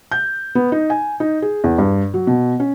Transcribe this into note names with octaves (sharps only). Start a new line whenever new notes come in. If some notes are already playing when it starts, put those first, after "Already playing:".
G6
B3
D#4
G#5
D#4
G#4
E2
G2
F#3
B2
C#4